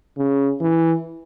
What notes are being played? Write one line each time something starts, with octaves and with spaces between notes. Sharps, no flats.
C#3
E3